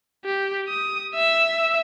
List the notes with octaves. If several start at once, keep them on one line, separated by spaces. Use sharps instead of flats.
G4
D#6
E5 E6